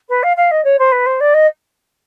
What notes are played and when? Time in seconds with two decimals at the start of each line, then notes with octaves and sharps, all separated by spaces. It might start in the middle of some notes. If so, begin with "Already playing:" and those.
0.09 B4
0.23 F5
0.36 F5
0.51 D#5
0.64 C#5
0.78 C5
0.92 B4
1.06 C5
1.20 D5
1.34 D#5